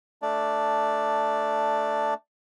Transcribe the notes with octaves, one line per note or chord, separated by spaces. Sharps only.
A3 D4 D5